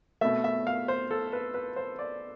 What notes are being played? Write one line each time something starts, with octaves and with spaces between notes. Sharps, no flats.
B2 A3 E5
E5
F5
C5
A4
B4
B4
C5
D5